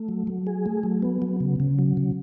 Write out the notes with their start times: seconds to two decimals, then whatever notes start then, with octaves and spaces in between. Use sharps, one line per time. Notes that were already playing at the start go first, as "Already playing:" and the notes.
Already playing: A3
0.09 F#3
0.27 F#3
0.47 G#4
0.66 A3
0.83 F#3
1.02 B3
1.22 F#3
1.40 C#3
1.60 C#3
1.79 F#3
1.97 C#3